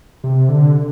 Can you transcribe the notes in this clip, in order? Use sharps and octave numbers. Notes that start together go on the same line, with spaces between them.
C3
D3